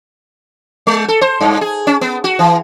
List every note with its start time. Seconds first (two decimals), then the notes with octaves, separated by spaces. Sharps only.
0.87 G#3
1.08 A4
1.21 C5
1.41 G2
1.61 G#4
1.87 C#4
2.01 B3
2.24 F#4
2.39 E3